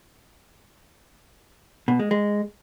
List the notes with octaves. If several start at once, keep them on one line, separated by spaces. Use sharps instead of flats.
B2
G#3
G#3